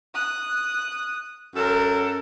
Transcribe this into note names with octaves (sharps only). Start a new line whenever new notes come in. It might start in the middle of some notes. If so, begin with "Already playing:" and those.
D#6 F#6
F#2 F#3 A4 A#4